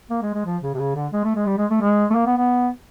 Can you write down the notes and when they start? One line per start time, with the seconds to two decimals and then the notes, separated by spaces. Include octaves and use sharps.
0.10 A#3
0.22 G#3
0.33 G#3
0.45 F3
0.62 C#3
0.74 C3
0.78 C#3
0.95 D3
1.12 G#3
1.24 A3
1.36 G#3
1.46 G3
1.57 G#3
1.70 A3
1.81 G#3
2.10 A3
2.14 A#3
2.26 B3
2.37 B3